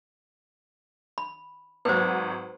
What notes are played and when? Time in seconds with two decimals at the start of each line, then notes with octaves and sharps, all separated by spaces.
1.18 B5
1.85 G#1 F#3 B4 C5